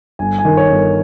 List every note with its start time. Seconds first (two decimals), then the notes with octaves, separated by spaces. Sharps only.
0.19 G1 G#5
0.39 G#5
0.45 D#3
0.57 C#5
0.70 G1
0.76 A#4